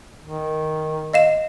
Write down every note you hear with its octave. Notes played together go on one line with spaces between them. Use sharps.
D#3
D#5 F5 E7